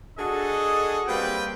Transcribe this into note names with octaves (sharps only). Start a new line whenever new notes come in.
D4 F#4 G#4 A4 D#5
G3 A#3 C4 B4 G5